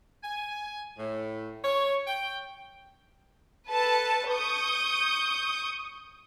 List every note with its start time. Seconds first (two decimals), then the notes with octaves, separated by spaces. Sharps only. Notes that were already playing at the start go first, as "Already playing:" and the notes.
0.23 G#5
0.98 A2
1.63 C#5
2.07 G5
3.70 A4 B4 A5
4.32 C#6 D#6 G6